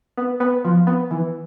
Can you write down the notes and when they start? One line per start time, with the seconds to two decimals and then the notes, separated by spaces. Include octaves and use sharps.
0.17 B3
0.40 B3
0.65 F3
0.87 B3
1.11 E3